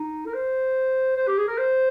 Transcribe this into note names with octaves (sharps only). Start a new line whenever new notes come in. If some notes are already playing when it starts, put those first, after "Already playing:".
Already playing: D#4
A#4
C5
C5
G4
G#4
A#4
C5